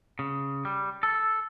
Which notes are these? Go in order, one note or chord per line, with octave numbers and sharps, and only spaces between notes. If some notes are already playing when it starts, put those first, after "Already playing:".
C#3
G3
A4